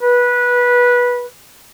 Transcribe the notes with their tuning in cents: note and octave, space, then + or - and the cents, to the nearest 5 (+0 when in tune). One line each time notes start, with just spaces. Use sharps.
B4 -15